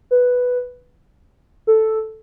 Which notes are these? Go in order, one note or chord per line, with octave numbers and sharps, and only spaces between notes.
B4
A4